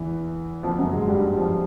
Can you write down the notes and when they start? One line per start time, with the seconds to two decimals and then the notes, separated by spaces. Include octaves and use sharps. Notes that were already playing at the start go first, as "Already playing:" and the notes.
Already playing: E2 E3
0.63 F2 F3
0.78 F#2 F#3
0.93 G#2 G#3
1.07 G2 G3
1.37 F2 F3